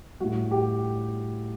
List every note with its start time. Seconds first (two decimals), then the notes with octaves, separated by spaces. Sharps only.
0.20 A2 G3 F#4
0.51 G4